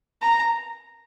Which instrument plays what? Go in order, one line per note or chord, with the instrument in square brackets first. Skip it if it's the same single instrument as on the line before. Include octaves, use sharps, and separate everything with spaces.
[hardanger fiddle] A#5